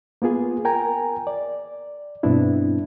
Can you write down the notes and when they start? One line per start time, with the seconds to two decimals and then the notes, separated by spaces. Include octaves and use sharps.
0.22 A#3 B3 F4 G#4
0.65 A#4 G5 G#5 A#5
1.27 D5
2.23 G2 B2 B3 C4 D4 E4